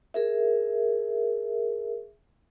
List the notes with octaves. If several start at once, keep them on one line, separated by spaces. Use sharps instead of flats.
G#4 A#4 E5